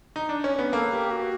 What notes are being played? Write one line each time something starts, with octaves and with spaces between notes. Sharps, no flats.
D#4
D4
C#4
B3
A#3 A4
G4
F#4